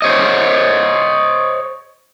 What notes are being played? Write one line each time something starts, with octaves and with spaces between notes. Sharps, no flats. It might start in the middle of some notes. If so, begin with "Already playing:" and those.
C5 C#5 D#5